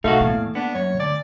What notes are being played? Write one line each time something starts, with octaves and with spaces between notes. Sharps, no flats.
B2 A3 D#4 F4 F#4 F5
E2 A2 A#3
B3 D4
F#2 C#5
D2 D5